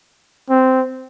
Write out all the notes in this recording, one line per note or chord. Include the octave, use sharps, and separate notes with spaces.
C4